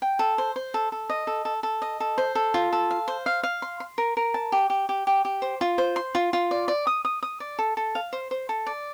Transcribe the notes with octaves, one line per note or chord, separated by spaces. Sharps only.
G5
A4
C5
C5
A4
A4
D#5
A4
A4
A4
D#5
A4
C5
A4
F4
A4
F5
C5
F5
F5
C6
C6
A#4
A#4
A5
G4
G4
G4
G4
G4
C5
F4
C5
C6
F4
F4
D5
D5
D#6
D#6
D#6
D5
A4
A4
F5
C5
C5
A4
D5